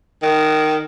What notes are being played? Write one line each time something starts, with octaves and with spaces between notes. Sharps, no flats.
D#3